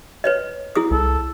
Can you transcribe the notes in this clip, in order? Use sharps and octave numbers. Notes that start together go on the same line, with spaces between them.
B4 C#5 D#5
E4 G#4 D#6
C2 A4